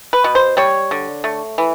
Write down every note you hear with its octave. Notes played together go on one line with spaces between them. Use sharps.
B4
B2
C5
G3 C#5
D3
A3
E3